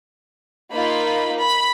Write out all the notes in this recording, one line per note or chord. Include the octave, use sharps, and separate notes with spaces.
A#3 D#4 F4 B5
B5